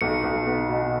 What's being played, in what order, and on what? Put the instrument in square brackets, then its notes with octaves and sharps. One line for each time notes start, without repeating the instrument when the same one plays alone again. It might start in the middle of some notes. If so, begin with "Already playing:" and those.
[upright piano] B1 [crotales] C#7
[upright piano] B1
B3
B2